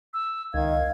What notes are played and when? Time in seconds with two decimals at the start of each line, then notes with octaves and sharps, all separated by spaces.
0.14 E6
0.54 C#2 D#3 F5 G#6